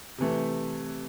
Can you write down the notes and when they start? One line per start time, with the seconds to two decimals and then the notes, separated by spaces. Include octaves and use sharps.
0.18 C3 E3 A3